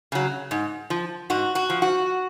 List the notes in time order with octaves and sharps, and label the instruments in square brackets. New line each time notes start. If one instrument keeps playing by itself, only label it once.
[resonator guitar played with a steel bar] C#3 F#3
G#2
F3
G#2 F#4
F#4
F3
F#4